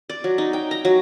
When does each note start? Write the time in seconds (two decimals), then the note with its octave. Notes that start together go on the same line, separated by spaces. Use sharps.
0.10 D5
0.24 F#3
0.38 D#4
0.53 G5
0.71 A#5
0.85 F#3